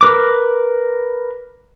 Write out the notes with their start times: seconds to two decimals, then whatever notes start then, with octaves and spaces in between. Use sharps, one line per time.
0.01 A#4 B4 D6